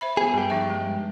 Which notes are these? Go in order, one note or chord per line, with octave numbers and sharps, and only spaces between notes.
C5 E5 B5
B3 G#4
G2 G4 G#4
F3 D#4 E5
G3 G#3